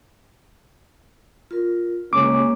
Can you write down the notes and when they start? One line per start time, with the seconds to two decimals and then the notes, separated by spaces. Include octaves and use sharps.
1.51 F4 A#4
2.13 C#2 A#3 C#4 D6